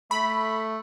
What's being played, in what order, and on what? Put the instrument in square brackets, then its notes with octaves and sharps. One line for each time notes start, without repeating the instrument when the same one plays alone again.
[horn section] A3 [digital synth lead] B5